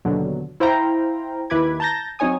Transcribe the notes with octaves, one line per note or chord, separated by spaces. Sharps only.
D#2 B2 D3 F#3
E4 C5 F5 G5 A#5
D#2 E4 B4 B5 D6 G#6
A5 A#5 G6 A6 A#6
F#3 C4 D#4 C#5 G#5 D#6